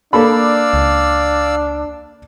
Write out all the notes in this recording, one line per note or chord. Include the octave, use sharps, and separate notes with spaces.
A#3 D4 A4 D5 F5 B5 E6
C#2